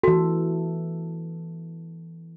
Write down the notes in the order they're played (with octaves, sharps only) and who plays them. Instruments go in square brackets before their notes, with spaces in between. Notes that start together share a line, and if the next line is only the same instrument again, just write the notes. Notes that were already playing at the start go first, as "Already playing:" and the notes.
[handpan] E3 A4 [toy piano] F#4